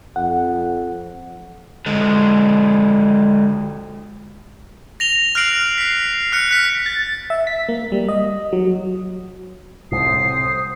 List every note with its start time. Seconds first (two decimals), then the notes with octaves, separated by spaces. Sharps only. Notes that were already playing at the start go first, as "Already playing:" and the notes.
0.16 F2 F#5
1.86 D3 G#3
5.00 A#6 F7 G7
5.35 F6 F#6 A#6 C7 D7 F#7
5.78 B6 C7
6.33 F6 F#6 C#7
6.49 F6 F#6 B6
6.86 A6
7.30 E5
7.47 B6
7.68 A#3
7.92 G3
8.08 D#5
8.53 F#3
9.92 C2 A2 C5 D#6 C7